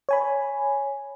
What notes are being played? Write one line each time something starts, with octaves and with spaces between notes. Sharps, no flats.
C#5 G#5 B5